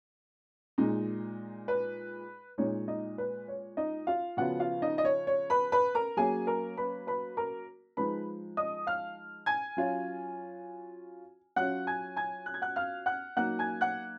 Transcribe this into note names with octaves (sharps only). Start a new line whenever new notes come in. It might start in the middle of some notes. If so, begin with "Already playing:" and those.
A#2 G#3 D#4
B4
A#2 G#3 D#4 C#5
D#4 D#5
B4
C#5
D#4 D#5
F4 F5
C#3 F3 B3 F4 F#4 F#5
F4 F5
D#4 D#5
D#5
C#5
C#5
B4 B5
B4 B5
A#4 A#5
F#3 A#3 C#4 G#4 G#5
A#4 A#5
B4 B5
B4 B5
A#4 A#5
F3 G#3 D#4 B4 B5
D#5 D#6
F5 F6
G#5 G#6
F#3 C#4 F4
F#3 C#4 F4 F#5 F#6
G#5 G#6
G#5 G#6
F#6
G#6
F#5 F#6
F5 F6
F#5 F#6
F#3 A#3 D#4 F#5 F#6
G#5 G#6
F#5 F#6